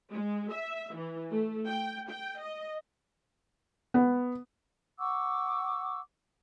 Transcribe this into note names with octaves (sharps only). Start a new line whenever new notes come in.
G#3
E5
E3
A3
G5
G5
D#5
B3
F#5 C#6 D6 E6